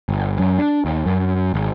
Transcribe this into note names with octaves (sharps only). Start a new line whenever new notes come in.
G1
F#2
D4
D#2
F#2
G#1